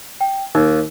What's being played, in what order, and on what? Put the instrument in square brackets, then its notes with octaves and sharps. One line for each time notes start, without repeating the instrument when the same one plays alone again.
[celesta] G5
[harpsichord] D#2 [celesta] D#4